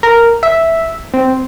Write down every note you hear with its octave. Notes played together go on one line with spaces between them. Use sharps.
A#4
E5
C4